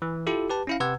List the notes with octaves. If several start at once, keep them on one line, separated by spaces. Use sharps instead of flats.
E3
E4 F4 G4 A4
G4 B4 A5
C#4 E4 F5
C3 B4 F#5 E6 G#6